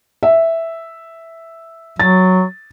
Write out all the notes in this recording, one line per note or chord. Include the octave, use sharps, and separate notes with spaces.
E5
F#3 A6